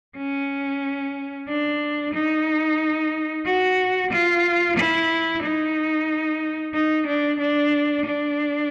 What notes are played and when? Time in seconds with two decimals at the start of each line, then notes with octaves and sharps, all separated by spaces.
0.17 C#4
1.49 D4
2.14 D#4
3.45 F#4
4.11 F4
4.77 E4
5.43 D#4
6.74 D#4
7.07 D4
7.40 D4
8.05 D4